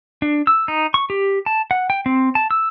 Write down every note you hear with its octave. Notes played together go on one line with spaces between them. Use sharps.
D4
E6
D#4
C#6
G4
A5
F#5
G5
C4
A5
E6